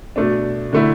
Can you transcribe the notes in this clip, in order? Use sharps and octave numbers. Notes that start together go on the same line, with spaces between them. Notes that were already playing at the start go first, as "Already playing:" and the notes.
B2 A3 D4
D3 A3 E4